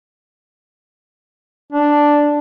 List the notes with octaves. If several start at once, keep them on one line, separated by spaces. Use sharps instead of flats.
D4